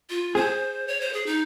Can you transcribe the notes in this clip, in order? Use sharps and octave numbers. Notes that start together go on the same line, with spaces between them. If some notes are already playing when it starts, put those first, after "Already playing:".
F4
G#4 C5
C#5
C5
G#4
D#4